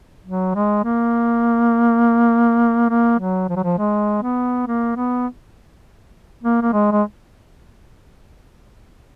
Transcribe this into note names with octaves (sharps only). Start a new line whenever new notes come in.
F#3
G#3
A#3
A#3
F#3
F3
F#3
F3
G#3
B3
A#3
B3
A#3
A#3
G#3
G#3